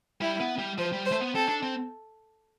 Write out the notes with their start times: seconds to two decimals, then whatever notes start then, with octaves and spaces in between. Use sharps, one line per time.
0.21 G3 E4
0.40 B3
0.58 G3
0.78 F3 C5
0.92 G3
1.06 C5
1.12 A3
1.20 B3
1.35 C4 A4
1.48 D4
1.63 C4